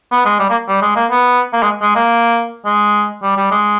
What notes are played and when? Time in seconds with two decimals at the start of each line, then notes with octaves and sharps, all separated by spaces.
0.12 B3
0.25 G#3
0.39 G3
0.50 A#3
0.68 G3
0.82 G#3
0.96 A#3
1.11 B3
1.53 A#3
1.62 G#3
1.82 G#3
1.95 A#3
2.65 G#3
3.23 G3
3.37 G3
3.51 G#3